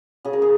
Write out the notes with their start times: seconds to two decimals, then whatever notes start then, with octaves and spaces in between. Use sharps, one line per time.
0.25 C#3 G#4
0.33 A#4
0.42 G#4